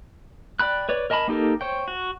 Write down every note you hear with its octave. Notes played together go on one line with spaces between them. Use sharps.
D5 G5 B5 F#6
B4 C#5 D5
A#4 D#5 G#5 A5 B5
A#3 D#4 G4 A4 A#4
C5 C#5 G5
F#4